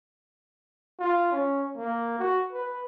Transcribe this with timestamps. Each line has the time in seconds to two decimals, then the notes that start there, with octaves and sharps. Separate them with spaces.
0.99 F4
1.31 C#4
1.77 A#3
2.19 F#4
2.53 B4